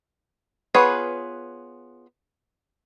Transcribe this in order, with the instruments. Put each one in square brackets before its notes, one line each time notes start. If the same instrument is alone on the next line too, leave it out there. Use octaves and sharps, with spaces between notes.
[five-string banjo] B3 F4 G#4 B4 C#5